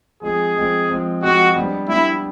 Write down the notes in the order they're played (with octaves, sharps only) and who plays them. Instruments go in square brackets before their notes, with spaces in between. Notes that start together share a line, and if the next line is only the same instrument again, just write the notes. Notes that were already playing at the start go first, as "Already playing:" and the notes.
[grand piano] F3 G#3 C4 [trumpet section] G#4
[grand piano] F3 G#3 C4
F3 G#3 C4
[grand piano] F3 G#3 C4 [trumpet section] F#4
[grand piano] G3 B3 D4
[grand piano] G3 B3 D4 [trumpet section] E4